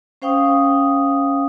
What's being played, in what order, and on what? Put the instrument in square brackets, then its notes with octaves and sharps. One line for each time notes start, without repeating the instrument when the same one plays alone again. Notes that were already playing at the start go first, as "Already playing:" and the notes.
[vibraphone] C#4 C5 F5 G5 C#6 D#6